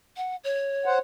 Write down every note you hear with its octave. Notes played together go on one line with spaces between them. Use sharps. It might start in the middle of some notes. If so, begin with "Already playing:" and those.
F#5
C#5
C5 F#5